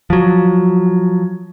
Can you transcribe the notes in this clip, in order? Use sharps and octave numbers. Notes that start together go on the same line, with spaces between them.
F3 F#3